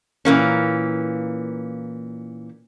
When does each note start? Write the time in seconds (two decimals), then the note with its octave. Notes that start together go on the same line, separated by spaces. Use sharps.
0.25 A#2 E3 A#3 C#4